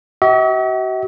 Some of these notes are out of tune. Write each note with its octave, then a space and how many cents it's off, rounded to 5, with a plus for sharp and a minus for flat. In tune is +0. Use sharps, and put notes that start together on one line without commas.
F#4 +40 E5 -45